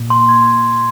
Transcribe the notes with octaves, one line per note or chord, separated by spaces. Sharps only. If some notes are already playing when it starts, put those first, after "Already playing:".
Already playing: A#2
C6
G#6